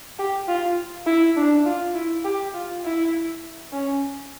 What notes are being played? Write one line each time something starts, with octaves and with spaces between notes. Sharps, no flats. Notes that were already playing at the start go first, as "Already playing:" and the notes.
G4
F4
E4
D4
F4
E4
G4
F4
E4
C#4